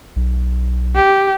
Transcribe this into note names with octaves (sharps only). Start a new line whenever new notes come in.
B1
G4